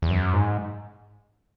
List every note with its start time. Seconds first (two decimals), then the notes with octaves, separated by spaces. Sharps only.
0.02 E2
0.10 F#2
0.33 G#2